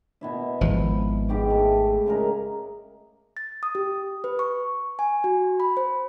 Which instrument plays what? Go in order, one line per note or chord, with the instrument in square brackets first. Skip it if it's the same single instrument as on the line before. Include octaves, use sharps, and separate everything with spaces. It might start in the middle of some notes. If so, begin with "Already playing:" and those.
[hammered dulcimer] B2 E4 E5
[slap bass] G#1 F3
[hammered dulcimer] G#2 G4 D6
A3
C#3 G#3 A#4
[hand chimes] A6
D#6
G4
B4
C#6
G#5
F#4
B5
C5